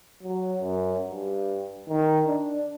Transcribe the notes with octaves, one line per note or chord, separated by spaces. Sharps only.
F#3
F#2
G2
D#3
D4